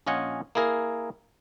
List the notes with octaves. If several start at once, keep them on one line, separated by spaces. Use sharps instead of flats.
A#1 C#4 F4 D#5 F#5 G#5
A#3 E4 G#4 A#4